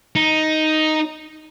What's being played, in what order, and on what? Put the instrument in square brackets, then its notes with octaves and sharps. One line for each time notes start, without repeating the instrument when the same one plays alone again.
[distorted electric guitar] D#4